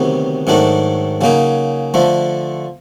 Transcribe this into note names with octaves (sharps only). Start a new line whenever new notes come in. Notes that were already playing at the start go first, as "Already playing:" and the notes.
Already playing: D2 C3 D#3 F#3 B3
G#2 D#3 F#3 A3 D4
C#3 F#3 A#3 D#4
D3 F3 A3